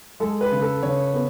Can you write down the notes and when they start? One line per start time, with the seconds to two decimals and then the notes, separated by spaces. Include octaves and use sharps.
0.20 G#3 A4
0.41 B4
0.51 C#3
0.62 A4
0.83 C#3 C#5
1.14 B3